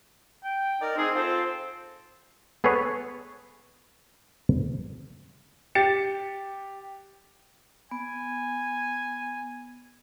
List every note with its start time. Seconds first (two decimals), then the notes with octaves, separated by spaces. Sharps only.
0.44 G5
0.80 D#4 A#4 D5
0.96 C4 D#4 G#4
1.15 F4 A4 C5
2.64 B3 G#4 A4 B4 C#5
5.75 G4 A6 C#7
7.91 B3 G#5